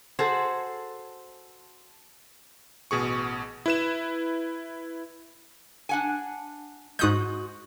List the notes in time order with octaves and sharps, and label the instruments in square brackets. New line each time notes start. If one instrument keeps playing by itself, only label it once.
[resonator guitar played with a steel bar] F#4 G#4 A4 C5
[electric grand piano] A1 B2 G#4 C#6
E4 B4 E7
[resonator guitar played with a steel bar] D4 F#5 G#5
[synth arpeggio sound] G#2 D#6 G6 [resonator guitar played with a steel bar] G#3 F#4